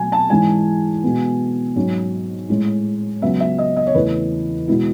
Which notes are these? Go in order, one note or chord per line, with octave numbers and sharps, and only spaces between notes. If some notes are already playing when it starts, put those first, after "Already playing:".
Already playing: B2 F#3 A3 G#5
A5
G#2 E3 G#3 C#4 G#5
B2 G#3 B3
G#2 F#3 C#4
A2 G#3 C#4
C#2 C#3 F#3 B3 E5
E5
D#5
D#5
C#5
E2 C#3 E3 A3 B4
B2 G#3 B3 E4